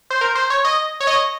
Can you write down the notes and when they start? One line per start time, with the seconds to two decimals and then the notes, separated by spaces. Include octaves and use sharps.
0.11 C5
0.21 A#4
0.35 C5
0.50 C#5
0.65 D#5
1.01 C#5
1.07 D#5